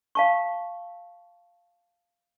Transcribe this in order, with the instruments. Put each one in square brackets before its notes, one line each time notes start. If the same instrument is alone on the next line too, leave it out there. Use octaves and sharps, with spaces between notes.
[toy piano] F5 A5 C#6